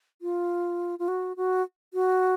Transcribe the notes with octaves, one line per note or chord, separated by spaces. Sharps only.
F4
F4
F#4
F#4
F#4